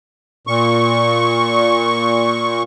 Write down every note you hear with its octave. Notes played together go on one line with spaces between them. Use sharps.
A#2 C#6